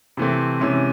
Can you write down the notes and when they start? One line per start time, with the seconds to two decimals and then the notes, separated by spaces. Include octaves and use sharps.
0.17 C3 E3 A3 C4
0.60 C3 E3 G#3 C#4 E4